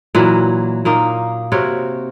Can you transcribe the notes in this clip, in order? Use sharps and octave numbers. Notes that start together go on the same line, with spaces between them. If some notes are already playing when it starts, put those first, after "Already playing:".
A#2 E3 F#3
A#2 A#3 D#4
C3 F#4 A#4 C#5